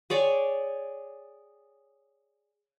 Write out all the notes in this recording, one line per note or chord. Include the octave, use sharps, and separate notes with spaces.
G#4 C#5 D5 G5